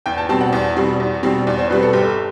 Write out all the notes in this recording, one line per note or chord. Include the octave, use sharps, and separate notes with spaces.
E2 G5
A5
B2 G3 C4 A5
F#5
E2
B2 G3 C4
E2
B2 G3 C4
E2 D5
C5
B2 G3 C4 B4
A4
G1 G4